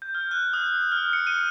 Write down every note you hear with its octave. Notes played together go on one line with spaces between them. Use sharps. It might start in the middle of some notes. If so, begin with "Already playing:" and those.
G6
F6
F#6
D#6
F6
C#7
D#7